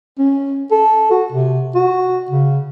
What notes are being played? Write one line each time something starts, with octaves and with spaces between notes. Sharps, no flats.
C#4
A4
F#4
C3
F#4
C#3